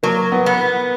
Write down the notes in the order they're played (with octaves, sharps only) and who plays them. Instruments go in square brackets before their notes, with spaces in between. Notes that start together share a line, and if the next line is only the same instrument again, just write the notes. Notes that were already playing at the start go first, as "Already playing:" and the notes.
[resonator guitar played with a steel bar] F#3 [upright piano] A#3
[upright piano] B3
[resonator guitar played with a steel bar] B3